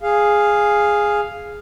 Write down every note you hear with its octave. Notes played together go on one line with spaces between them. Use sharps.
G#4 F5